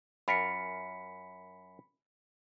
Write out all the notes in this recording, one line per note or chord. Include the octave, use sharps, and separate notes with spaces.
F#2 F4 A#4 B5 B6 C#7